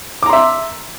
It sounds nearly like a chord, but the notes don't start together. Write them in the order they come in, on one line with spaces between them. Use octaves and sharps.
D6 A#5 C6 E5